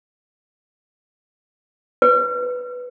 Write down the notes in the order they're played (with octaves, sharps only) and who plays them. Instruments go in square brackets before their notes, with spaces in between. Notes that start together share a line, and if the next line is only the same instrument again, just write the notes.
[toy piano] B4